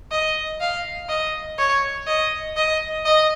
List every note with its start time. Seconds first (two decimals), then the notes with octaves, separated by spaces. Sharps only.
0.11 D#5
0.61 F5
1.09 D#5
1.58 C#5
2.07 D#5
2.56 D#5
3.05 D#5